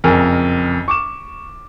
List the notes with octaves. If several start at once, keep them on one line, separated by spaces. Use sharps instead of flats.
F#1 F2 G#4 A#4
C#6 D6 E7